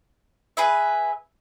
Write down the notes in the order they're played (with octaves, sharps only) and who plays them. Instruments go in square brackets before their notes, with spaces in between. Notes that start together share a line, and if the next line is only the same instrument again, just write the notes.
[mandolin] G#4 B4 E5